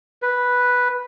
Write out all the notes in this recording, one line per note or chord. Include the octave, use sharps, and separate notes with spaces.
B4